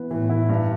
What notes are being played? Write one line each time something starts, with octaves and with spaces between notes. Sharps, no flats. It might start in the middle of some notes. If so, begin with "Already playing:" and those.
Already playing: E3 B3
A2 E3
E4
G2